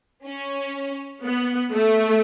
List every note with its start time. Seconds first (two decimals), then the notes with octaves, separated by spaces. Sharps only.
0.26 C#4
1.23 B3
1.71 A3